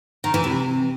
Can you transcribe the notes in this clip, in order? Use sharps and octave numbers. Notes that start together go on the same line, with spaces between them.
D#3
E3
C3